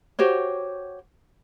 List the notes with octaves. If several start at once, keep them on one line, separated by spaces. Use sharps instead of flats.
F#4 G4 C5 C#5